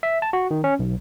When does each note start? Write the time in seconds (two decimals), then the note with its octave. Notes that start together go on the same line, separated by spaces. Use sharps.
0.03 E5
0.22 A5
0.33 F#4
0.51 D#3
0.64 C#4
0.79 B1